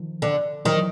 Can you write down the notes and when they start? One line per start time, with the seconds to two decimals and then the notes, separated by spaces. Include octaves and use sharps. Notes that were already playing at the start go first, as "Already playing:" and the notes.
Already playing: D#3 F3
0.22 D3
0.65 D#3 E3 F#3